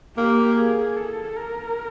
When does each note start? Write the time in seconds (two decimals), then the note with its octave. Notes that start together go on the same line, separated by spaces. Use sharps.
0.18 A#3 G4
0.57 G#4
0.96 A4
1.36 A#4